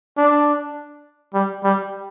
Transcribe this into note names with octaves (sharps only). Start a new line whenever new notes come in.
D4
G3
G3